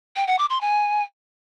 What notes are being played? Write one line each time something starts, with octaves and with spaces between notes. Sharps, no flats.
G5
F#5
D6
C6
G#5